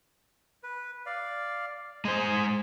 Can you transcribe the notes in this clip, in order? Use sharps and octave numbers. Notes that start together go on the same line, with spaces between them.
B4
D5 F5
G#3 G#4 C5